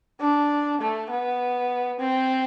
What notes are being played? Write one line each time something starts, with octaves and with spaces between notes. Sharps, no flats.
D4
A3
B3
C4